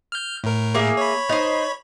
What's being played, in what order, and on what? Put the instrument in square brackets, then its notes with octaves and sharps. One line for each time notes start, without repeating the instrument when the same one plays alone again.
[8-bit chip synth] F6 G6
A2 A#4
[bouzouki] A#3 G#4 E5
[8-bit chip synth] C#5 B5
[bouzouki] D#4 C5